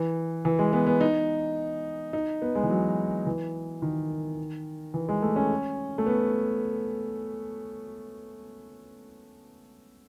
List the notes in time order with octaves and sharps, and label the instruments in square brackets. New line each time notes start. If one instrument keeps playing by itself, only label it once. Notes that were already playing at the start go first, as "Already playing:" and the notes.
Already playing: [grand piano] E3
E3
G#3
B3
B3
D#4
D#4
B3
G#3
E3
F#3
E3
D#3
E3
G#3
A3
C#4
A3
B3